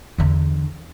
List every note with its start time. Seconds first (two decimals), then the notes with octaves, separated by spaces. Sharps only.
0.18 E2 D3